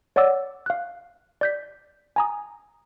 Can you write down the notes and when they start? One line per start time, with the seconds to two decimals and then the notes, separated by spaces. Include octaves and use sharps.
0.16 C#5 D5 F#5 D6 E6 A6
0.66 F5 F#6
1.41 D5 G6 B6
2.16 G#5 A#5 D#6